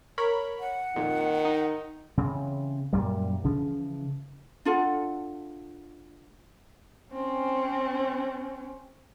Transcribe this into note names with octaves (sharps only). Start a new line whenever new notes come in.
A#4 C#5 B5
F#5
F2 A#2 D#3
D#4
C#3 E3 C4
F#2 A#2 G3
C#3 E3 F3
D4 F4 A4 F#5
C4 C#4